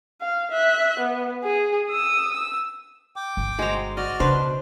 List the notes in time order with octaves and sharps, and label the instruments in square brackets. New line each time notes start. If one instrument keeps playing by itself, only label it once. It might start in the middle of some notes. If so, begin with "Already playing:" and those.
[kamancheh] F5
E5 F#6
B3
G#4
D#6 E6
E6
[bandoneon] G5 D6
[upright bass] G1
[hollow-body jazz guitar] G#3 C5 [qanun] F#4 A#5
[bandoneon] F#4 D5 F6 [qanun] D#5
[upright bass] C#3 [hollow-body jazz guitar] D4 B4 [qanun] C5
[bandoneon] B2